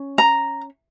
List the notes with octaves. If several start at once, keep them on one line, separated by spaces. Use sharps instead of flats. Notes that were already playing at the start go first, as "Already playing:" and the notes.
Already playing: C#4
A#5